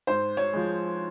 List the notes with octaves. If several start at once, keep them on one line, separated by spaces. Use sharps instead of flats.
G#2 C5
C#5
F3 G#3